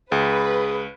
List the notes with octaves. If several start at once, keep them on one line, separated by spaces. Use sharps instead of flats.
C#2 G#4 B4